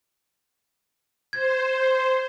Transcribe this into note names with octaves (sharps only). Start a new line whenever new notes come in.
C5 G#6